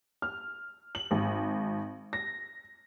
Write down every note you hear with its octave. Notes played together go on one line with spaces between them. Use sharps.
F6
F#7
G#1
A#6